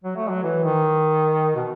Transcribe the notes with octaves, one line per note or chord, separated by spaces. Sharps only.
F#3
A3
F#3
E3
D#3
B2